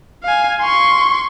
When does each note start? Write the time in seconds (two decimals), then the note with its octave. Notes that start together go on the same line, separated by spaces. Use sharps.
0.24 F5 G#5
0.62 C6 C#6